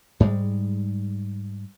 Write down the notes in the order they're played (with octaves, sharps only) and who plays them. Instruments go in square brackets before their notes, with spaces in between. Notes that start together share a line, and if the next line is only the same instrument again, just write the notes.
[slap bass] G#2 G3 G#3